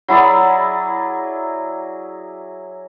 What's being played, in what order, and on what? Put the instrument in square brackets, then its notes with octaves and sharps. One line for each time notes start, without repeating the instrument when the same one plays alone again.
[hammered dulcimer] F#3 E4 G#4 D5